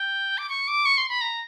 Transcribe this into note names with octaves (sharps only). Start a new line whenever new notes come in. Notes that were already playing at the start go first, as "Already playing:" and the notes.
Already playing: G5
D6
C#6
D6
C#6
C6
B5
A#5